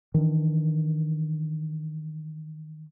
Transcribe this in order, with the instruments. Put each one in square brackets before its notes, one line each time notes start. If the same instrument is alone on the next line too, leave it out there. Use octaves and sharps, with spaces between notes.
[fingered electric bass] D#3 E3 D4